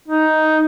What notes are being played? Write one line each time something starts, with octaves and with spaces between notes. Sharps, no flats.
D#4